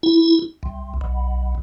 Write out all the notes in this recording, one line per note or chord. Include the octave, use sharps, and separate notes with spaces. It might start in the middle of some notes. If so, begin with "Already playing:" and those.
E4
C2
B1